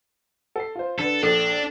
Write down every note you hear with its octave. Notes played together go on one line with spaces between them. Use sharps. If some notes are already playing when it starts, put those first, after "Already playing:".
A4 C7
F4 C5
D3 A4 B4
A#1 D4 A4